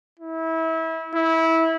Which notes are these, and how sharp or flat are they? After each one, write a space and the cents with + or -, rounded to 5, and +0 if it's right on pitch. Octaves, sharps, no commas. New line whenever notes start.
E4 -25
E4 -20